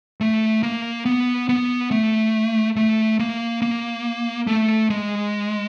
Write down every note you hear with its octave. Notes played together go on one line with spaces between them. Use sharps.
A3
A#3
B3
B3
A3
A3
A#3
A#3
A3
G#3